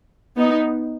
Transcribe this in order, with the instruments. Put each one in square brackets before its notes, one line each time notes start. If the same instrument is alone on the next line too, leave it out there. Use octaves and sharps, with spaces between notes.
[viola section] B3 D#4